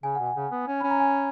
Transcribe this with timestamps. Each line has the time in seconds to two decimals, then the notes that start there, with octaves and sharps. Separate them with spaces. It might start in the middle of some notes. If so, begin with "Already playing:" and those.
0.03 C#3 G#5
0.15 B2 F#5
0.26 G#5
0.35 C#3
0.51 B3
0.68 C#4
0.80 C#4 B5
0.90 A#5
1.00 G#5